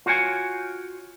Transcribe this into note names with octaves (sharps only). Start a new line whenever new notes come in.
F4 F#4 C#5 G5 G#5